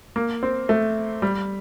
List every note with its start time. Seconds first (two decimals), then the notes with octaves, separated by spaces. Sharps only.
0.16 A#3
0.43 C4
0.69 A3
1.22 G3